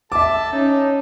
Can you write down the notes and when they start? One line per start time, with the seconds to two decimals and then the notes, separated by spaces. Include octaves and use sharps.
0.12 A4 E5 A5 D6
0.53 C#4 D#4